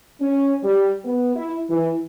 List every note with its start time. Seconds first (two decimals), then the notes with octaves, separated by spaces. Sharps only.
0.21 C#4
0.63 G3
1.05 B3
1.35 E4
1.70 E3